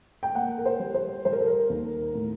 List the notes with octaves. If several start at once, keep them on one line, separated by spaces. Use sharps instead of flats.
G5
A#3 F#5
A#4
C5
G3
C5
G3 C5
A#4
A4
A#4
D#2
A2